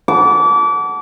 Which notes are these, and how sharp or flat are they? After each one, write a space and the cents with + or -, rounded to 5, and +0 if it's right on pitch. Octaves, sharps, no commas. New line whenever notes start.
F#5 +10 A5 -10 D6 -30